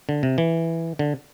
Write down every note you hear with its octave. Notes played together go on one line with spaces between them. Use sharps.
D3
C3
E3
D3